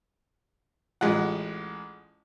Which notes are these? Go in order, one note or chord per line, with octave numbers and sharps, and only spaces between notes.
A1 G#3 F4 F#5